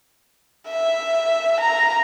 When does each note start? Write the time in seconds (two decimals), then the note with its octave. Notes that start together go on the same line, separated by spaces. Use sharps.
0.68 E5
1.60 A#5